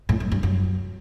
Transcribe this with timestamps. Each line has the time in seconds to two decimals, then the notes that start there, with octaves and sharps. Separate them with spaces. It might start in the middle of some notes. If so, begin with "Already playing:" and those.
0.09 A2
0.20 G2
0.32 G2
0.43 F#2